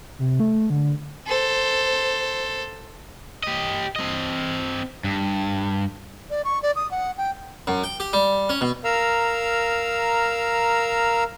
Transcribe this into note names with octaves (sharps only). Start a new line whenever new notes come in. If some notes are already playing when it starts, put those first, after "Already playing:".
C3
A3
D3
A4 C5
G4 D#5
C4 D#5
G2
D5
C#6
D5
D#6
F#5
G5
F#2
G5
G4
G3
C#4
B2
A#4 F5 A#5 E6